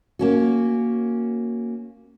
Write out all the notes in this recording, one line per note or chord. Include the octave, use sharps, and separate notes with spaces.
A#3 C#4 F#4